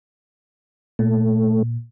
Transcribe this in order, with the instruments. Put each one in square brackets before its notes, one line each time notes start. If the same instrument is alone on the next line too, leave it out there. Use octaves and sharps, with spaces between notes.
[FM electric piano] A#2 [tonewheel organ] A3